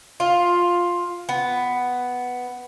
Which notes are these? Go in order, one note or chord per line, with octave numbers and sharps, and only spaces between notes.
F4
B3